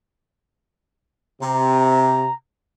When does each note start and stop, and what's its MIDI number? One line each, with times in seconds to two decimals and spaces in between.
1.42 2.28 48
1.42 2.33 82